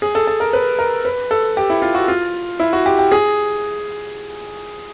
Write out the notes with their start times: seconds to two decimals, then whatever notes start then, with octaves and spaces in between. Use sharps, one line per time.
0.02 G#4
0.15 A4
0.27 A4
0.40 A#4
0.53 B4
0.79 A#4
1.05 B4
1.31 A4
1.57 G4
1.70 E4
1.82 F4
1.95 F#4
2.08 F4
2.60 E4
2.73 F#4
2.86 G4
2.99 G4
3.12 G#4